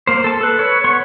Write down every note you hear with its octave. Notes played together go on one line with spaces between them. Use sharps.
A#3 C5
A4 A5
A4 B4
B4 C#5
B3 C#5 C6 C#6